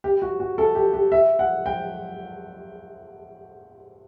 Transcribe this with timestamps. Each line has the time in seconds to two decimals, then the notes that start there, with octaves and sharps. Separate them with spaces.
0.04 G4
0.22 F#4
0.40 F#4
0.58 A4
0.75 G4
0.93 G4
1.12 E5
1.39 F#5
1.66 G5